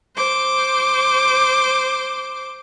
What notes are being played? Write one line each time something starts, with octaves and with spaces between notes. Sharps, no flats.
C5 D6